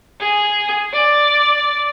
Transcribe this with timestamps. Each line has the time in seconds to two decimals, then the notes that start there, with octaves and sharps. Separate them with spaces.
0.20 G#4
0.93 D5